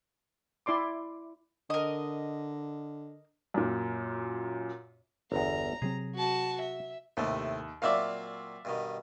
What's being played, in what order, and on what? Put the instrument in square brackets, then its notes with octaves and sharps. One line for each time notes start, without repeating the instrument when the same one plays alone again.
[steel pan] E4 D5 C6 D6
[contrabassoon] D3 [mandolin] A#4 D#5
[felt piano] F#2 A#2
[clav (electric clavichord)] G1 E2 [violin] A#5
[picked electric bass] C3 F#3 C4 [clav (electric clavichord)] G#4
[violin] F#4 A5
E5
[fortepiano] D#2 [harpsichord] A2 C3 A3
[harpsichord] A#2 F#3 C4 [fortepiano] D5 E5 F5
[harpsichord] G2 B2 D#3